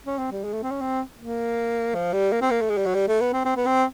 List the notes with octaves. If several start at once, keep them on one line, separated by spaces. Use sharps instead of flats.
C#4
C4
G3
G#3
A3
C4
C#4
C4
A#3
F3
G3
A#3
C4
A#3
A3
G#3
G3
F#3
G3
A3
B3
C4
C4
B3
C4